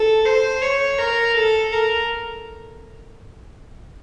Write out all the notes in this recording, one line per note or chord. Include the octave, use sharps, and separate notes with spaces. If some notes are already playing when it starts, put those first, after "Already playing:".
Already playing: A4
C5
C#5
A#4
A4
A#4